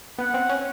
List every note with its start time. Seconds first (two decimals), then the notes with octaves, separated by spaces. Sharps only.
0.18 B3 F#5
0.34 C4
0.49 C#4